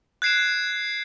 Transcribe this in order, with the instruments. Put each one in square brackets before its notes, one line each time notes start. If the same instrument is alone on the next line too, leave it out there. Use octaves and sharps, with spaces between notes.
[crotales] F#6 G#6 C7 D7 E7